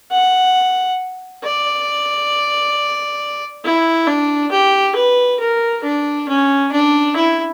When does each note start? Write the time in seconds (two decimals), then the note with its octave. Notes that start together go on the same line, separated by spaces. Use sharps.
0.11 F#5
1.44 D5
3.64 E4
4.07 D4
4.51 G4
4.96 B4
5.39 A#4
5.83 D4
6.28 C#4
6.72 D4
7.16 E4